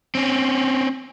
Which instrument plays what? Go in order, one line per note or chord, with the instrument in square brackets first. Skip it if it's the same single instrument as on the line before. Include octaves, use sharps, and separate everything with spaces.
[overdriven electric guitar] C4 C#4